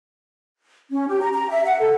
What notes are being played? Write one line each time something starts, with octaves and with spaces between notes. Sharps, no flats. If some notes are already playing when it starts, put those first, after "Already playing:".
C#4
G4
A#5
A#5
E5
F#5
A4